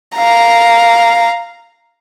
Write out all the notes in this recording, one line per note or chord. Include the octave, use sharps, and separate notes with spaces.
F5 A#5